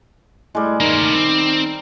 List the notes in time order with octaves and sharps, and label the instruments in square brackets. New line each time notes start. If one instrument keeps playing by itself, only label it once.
[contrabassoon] A2 [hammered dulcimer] G3 G#3
[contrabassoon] D#3 [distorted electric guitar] A3 A#3 [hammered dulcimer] A#4
[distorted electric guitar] C4